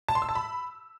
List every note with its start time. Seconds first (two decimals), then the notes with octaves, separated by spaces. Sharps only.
0.08 A5
0.15 C6
0.22 E6
0.29 A5
0.35 B5